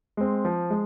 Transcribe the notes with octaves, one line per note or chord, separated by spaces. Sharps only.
G#3 C4
F3
G#3